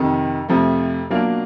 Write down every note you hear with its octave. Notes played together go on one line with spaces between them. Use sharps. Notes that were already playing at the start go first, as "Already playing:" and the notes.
Already playing: F2 C3 D#3
F2 C3 F3 A3
B2 F#3 A#3 D4 F4